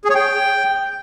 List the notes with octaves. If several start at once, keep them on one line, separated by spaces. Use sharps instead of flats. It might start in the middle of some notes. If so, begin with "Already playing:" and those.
G#4
C#5
G5